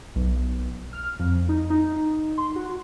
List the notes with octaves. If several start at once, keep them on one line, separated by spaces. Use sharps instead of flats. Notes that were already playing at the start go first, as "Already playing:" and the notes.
B1
F6
F2
D#4
D#4
C6
F#4